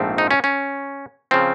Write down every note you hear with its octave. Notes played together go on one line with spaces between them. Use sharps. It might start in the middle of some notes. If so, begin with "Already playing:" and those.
Already playing: A#1 G#2 F3 A3 C4
D#4
C#4
C#4
C#3 F3 C4